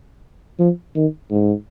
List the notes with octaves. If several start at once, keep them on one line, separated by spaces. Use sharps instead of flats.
F3
D#3
G#2